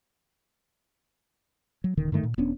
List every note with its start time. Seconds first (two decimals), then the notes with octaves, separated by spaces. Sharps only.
1.84 F#3
1.97 D#1 D3 D#3
2.12 G2 D3 D#3 A3
2.23 A#2
2.37 E1 B3 C#4 D4